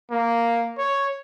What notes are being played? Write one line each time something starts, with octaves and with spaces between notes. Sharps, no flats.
A#3
C#5